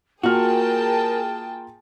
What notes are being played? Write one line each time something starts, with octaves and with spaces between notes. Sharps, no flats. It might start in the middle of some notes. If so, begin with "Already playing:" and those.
A#3 F4 F#4 G#4 A#4 G5 A5 F6